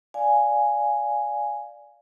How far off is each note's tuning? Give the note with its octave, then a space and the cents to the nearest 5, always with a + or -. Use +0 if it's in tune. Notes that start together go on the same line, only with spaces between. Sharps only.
D5 -5 F5 +0 G#5 +0